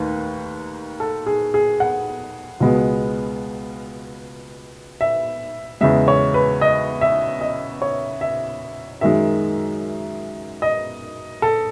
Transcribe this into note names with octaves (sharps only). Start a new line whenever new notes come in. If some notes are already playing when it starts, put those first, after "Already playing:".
Already playing: D#2 D#3 A3 B4
A4
G#4
G#4
F#5
C#2 B2 G#3 B3
E5
E2 C#3 G#3 E5
C#5
B4
D#5
E5
D#5
C#5
E5
F#2 D#3 G#3 E5
D#5
A4